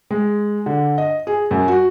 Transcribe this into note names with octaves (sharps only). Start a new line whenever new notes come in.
G#3
D3
D#5
G#4
F#2
F#4